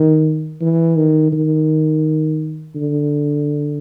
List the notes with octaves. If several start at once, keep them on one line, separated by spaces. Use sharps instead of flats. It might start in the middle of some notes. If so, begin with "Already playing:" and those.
Already playing: D#3
E3
D#3
D#3
D3